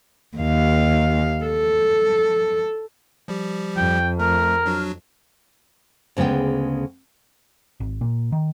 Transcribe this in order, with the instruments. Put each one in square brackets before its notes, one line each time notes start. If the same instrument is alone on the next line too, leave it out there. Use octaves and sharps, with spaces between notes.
[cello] D#2 F5
A4
[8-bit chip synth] F3 G3 G4
[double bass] F2 [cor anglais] G5
[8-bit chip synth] A3 [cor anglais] A#4 [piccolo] F6
[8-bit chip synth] F#3 D4 F#4
[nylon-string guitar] D2 C#3 G#3 B3 G5
[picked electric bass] G#1
A#2
D#3